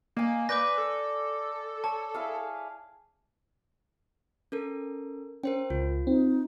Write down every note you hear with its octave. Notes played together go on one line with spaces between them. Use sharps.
A#3 D#5 G#5
B4 D5 D6 G6 A#6
A4
C#5 A5
E4 G#4 F5
C#4 A4 A#4
C#4 A#4 C5 G5
C#2 F4
C4 D#4